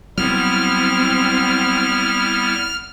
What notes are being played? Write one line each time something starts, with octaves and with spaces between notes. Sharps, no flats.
F#3 G3 B3 C4 E4 F6